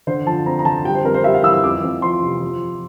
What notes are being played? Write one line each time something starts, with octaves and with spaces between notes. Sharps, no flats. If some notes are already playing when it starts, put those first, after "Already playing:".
D3 C5
F3 A5
C4 A#5
A#5
D3 A5
G3 G5
C5
F2 A#4
C5
G3 E5
F5
E3 E6
E6
F2 D6
F2
F3 C6
C3
F3
F3